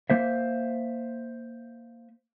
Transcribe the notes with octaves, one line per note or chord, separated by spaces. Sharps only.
A#3 C5 E5